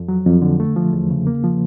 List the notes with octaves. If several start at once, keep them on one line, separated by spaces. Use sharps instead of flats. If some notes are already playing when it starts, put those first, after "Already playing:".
Already playing: F2
F#3
F2
D3
A3
F3
E2
C#3
A#3
F3